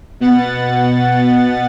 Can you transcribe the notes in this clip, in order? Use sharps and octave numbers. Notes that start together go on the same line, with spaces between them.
B2 B3 F#5 A6